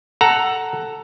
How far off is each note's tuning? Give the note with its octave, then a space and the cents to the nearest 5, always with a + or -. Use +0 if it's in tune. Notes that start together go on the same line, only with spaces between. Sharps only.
A4 +5 F#5 +10 A#5 +0